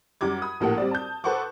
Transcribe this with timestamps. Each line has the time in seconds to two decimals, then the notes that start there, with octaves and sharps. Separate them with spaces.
0.21 F#2 G3 D6 G#6
0.42 B5 D#6
0.60 A#1 A2 A#3 G4 A4 F#5
0.78 G3 C4 D5
0.91 A5 G6
1.24 A4 B4 C5 F#5 C#6 D6